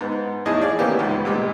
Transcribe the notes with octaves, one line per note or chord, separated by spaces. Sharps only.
G#2 B3
E2 A2 D#4 G#4 D#5 A5
G#4 D5 F5
A2 E3 A#3 B3 C#4 G4
C#2 G#2 B3
A#2 G3 G#3